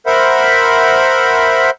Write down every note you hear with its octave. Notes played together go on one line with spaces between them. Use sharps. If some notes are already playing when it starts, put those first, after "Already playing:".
A#4 C5 E5 F#5 B5